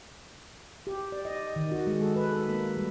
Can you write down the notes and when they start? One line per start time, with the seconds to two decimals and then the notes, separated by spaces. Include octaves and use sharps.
0.87 G4
1.12 D5
1.25 D#5
1.56 D#3
1.72 F#4
1.87 G#3
2.01 A4
2.16 B4
2.32 A4
2.48 A#3
2.77 G3